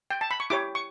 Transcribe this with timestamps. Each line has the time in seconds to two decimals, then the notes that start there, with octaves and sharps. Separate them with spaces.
0.10 G5
0.21 A5
0.31 B5
0.40 C#6
0.50 E4 G4 C#5 D6
0.75 C#6